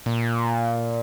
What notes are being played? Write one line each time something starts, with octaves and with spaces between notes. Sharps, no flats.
A#2